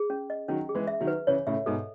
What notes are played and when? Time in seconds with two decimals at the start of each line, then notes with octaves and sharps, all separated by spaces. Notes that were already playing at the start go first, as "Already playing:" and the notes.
Already playing: G#4
0.10 C#4
0.30 D#5
0.48 D#3 F#3 C#4
0.69 G#4
0.75 E3 G#3
0.87 E5
1.01 D#3 F#3
1.07 B4
1.27 C#3 E3 C#5
1.46 A2 C#3 E5
1.66 G#2 B2 A4